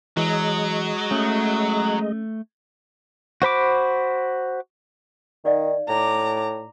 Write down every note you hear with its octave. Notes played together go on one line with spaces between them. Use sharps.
E3 F#3 G#3 D#5
A3 C#4
F#4 C5 B5 D6
D#3 D#4 D5 F5
A2 A#5 D6